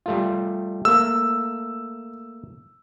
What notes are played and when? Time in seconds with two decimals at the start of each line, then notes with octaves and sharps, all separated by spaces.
0.06 G3 A3 F4
0.85 A3 A#3 E6